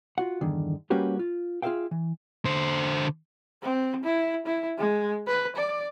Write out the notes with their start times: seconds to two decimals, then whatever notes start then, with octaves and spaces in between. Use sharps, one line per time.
0.18 F4 F#4 F#5
0.41 E2 G2 D3 D#3
0.90 G3 A#3 C#4 F#4 G4 B4
1.19 F4
1.62 F4 G#4 C5 E5 F5 G5
1.91 E3
2.45 D3 C5
3.62 C4
4.04 E4
4.46 E4
4.78 G#3
5.27 B4
5.56 D5